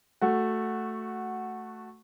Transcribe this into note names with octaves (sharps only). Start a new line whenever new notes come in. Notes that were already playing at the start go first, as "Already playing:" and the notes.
A3 F#4